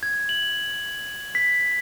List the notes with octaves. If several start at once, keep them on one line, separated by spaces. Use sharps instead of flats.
G#6
F#7
B6